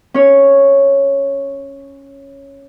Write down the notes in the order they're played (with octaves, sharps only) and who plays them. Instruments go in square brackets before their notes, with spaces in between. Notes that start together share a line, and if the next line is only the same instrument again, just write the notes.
[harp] C#4 C#5